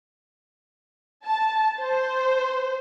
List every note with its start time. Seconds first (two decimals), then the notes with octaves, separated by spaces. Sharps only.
1.25 A5
1.79 C5